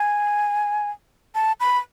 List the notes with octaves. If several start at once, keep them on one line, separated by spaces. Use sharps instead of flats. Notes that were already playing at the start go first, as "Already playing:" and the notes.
Already playing: G#5
A5
B5